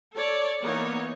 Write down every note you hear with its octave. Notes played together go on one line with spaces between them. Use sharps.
A4 C#5 D5
E3 A#3 B3 D#4 C#5